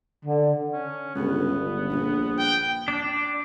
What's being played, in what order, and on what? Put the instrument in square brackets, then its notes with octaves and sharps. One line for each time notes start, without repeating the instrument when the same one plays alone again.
[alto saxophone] D3
[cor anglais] C#4
[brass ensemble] G1 [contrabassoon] C#2 [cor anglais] B3
[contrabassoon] A#1
[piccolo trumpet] G5
[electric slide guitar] D4